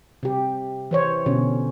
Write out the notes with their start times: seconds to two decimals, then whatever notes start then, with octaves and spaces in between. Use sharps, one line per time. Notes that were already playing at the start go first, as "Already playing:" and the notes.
0.23 C3 G4
0.91 E3 C5 C#5
1.26 B2 D3 C#4